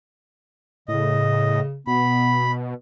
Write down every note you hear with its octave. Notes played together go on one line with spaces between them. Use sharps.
A2 C#3 D#5
B2 B3 B5